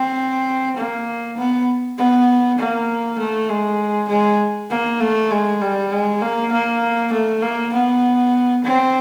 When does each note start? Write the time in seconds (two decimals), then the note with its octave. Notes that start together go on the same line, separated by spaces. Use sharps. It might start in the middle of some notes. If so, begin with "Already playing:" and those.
Already playing: C4
0.76 A#3
1.37 B3
1.98 B3
2.58 A#3
3.18 A3
3.49 G#3
4.09 G#3
4.70 A#3
5.00 A3
5.31 G#3
5.61 G3
5.92 G#3
6.22 A#3
6.52 A#3
7.13 A3
7.42 A#3
7.73 B3
8.64 C4